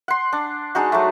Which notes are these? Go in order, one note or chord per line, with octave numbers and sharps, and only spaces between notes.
F#5 C6
D4
G#3 D4 D#4 F#4
F#3 A3